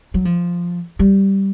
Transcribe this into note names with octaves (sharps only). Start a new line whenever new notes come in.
F#3
F3
G3